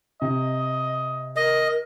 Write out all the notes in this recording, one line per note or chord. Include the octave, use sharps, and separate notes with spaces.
C3 D#5
A#4 D#5